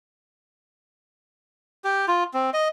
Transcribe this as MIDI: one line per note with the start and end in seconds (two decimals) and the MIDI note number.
1.84 2.06 67
2.08 2.24 65
2.34 2.50 60
2.54 2.68 75